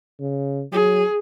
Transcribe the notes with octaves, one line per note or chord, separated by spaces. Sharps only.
C#3
F#3 G#4